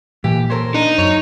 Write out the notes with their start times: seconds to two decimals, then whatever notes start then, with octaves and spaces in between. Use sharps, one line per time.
0.24 A#2 E3 G4
0.50 A4 A#4 C5 C#5
0.74 D4 D#4
0.98 F#2 C#5